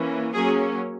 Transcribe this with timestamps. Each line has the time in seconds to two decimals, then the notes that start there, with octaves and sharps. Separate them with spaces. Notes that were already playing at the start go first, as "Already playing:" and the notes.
Already playing: E3 A#3 C#4
0.34 F#3 A#3 C#4 G#4